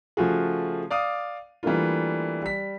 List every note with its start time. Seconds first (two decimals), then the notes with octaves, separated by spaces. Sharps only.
0.17 C#3 F3 A3 F4 F#4 G#4
0.90 D5 F5 D6 D#6
1.63 E3 G3 A3 A#3 D4 F4
2.42 G3 B6